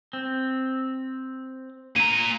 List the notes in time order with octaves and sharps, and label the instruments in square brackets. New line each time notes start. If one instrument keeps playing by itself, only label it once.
[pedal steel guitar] C4
[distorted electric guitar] A#2 A#5 [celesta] D#7